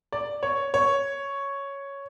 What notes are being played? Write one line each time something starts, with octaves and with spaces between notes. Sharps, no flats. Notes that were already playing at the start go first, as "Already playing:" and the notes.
D5
C#5
C#5